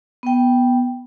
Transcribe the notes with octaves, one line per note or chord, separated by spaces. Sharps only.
B3 G5